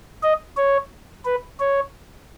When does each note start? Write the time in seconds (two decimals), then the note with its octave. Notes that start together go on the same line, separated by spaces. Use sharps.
0.23 D#5
0.57 C#5
1.25 B4
1.60 C#5